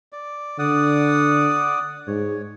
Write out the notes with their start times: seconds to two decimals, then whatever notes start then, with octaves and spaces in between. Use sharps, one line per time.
0.13 D5
0.59 D3 D5 F#5 D#6
2.07 G#2 C#5